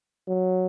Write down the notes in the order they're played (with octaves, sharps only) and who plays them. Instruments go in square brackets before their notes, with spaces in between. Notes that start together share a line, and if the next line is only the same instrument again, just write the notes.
[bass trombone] F#3